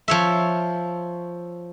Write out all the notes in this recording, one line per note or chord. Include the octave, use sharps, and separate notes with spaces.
F3 C#5 E5